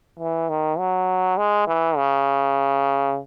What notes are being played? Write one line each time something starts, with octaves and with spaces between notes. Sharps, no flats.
E3
D#3
F#3
G#3
E3
C#3